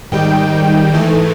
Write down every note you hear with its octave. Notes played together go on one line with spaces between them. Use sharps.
G#2 D#3 G3 G5
G#2 E3 A3